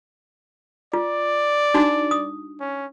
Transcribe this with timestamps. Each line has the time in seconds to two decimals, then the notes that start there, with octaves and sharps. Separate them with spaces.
0.93 F4 D5
1.74 D4 D#4 F#4
2.11 D#6
2.60 C#4